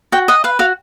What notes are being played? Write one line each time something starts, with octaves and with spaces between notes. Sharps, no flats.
F#4 G5
D#5 F#5
B4 F5
F#4 F5